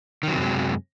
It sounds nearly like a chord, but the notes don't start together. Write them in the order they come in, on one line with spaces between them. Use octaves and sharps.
D#3 F#3 C3 F#2 G#3